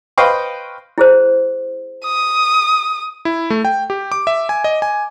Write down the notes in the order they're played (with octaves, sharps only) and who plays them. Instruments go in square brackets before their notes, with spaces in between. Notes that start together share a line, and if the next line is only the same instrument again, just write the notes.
[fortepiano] B4 C5 D#5 F5 G5 C#6
[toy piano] E4 G#4 C5
[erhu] D#6
[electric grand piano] E4
A3
G5
G4
D6
E5
G#5
D#5
G#5